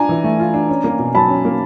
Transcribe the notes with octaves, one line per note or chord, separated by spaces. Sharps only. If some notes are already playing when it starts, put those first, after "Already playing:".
Already playing: D4 F4 G#5 A#5
E3
A3
F4
D4
C#4
A#3
B2
F#3 A5 B5
C#4
A#3